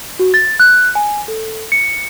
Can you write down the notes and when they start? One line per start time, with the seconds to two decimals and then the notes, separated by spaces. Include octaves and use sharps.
0.19 F#4
0.34 A6
0.60 F#6
0.95 G#5
1.28 A4
1.72 C#7